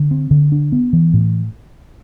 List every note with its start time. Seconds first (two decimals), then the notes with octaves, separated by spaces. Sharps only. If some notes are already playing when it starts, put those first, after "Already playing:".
Already playing: D3
0.11 C4
0.31 D3
0.52 D4
0.72 B3
0.93 E3
1.14 A2